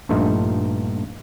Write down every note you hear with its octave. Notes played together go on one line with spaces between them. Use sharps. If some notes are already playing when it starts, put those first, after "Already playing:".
A#1 G2 A3 D#4 F4